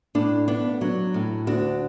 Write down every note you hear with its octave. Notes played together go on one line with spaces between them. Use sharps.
A2 D4
B3 D4
F#3
A2
D2 D4 F#4